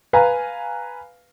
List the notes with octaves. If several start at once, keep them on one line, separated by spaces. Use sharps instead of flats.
B4 F5 G#5 A#5